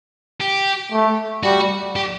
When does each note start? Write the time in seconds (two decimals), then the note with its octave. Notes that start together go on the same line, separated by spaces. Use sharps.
0.41 G4
0.92 A3
1.43 G3 F#4
1.96 G4